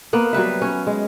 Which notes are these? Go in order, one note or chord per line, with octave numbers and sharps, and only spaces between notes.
A#3 B3 F#5
F#3 G3 B4 E5
C#4 C#5
G#3